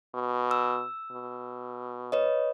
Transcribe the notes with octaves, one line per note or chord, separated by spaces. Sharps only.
B2
E6
B2
B4 C#5 D#5